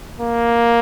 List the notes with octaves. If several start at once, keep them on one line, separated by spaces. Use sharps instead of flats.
A#3